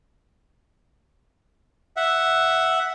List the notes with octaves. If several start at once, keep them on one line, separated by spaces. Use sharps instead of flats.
E5 F#5